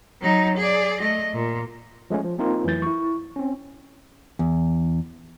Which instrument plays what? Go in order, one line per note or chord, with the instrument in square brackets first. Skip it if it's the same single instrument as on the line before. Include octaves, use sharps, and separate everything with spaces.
[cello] F#3 D#4
G#4 D5
A3 D#5
A#2
[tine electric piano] F3 G#3 A3 C#4
F3
A#3 C4 D#4 F4 A#4
F2 E3 F#3 A3 G6 A6
E4 C#6
C4 C#4
[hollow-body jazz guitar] E2